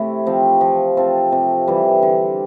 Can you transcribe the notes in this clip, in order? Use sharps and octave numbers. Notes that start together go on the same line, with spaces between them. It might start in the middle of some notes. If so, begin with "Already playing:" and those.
Already playing: C3 A3 E4
F3 C4
F3
C4 F4 A4
C3
E3 G3
D3